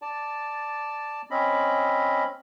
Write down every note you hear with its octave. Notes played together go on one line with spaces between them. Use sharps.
D5 A5
C4 C#4 D#5 B5